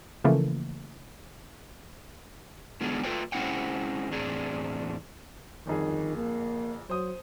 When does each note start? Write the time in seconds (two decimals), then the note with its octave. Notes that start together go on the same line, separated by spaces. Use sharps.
0.24 C#3 E3 F3 A3 A#3
2.81 D3 G#3 B3 D4 F4 G#4
3.03 A3 F4 A4 B4 C#5 G5
3.32 G#3 C4 C#4 E4 F#5 G5
4.11 E2 A2 C4 D4 G#4
5.67 G1 F2 D#3 G#4
6.16 A#3
6.90 F#3 C5 D#6